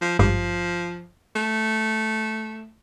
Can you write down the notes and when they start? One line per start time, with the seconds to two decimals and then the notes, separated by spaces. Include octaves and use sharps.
0.01 F3
0.19 G#1 G2 F3
1.35 A3